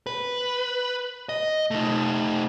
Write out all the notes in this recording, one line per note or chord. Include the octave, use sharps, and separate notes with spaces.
B4
D#5
A3 D#4